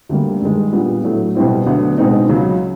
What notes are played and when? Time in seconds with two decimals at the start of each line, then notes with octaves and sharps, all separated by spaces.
0.09 D2 D3 G3 A#3
0.40 G2 D#3 G#3
0.73 A#2 G3 B3 D4 F4
1.03 A2 F#3 A3
1.35 B2 G3 C4 E4
1.66 D2 D3 F#3 B3 D4
1.98 B2 G#3 C4 D#4
2.29 C#2 C#3 F#3